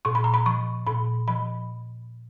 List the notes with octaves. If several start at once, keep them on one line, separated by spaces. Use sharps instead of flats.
A#2 C#6
B5
A#5
B5
F3 C#6
A#2 B5
F3 B5